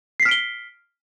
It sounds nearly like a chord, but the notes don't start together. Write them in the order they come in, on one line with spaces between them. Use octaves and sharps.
C7 B6 F6 D7 G7